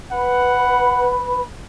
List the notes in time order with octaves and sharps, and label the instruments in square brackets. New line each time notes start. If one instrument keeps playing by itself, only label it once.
[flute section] B4 B5 [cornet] F#5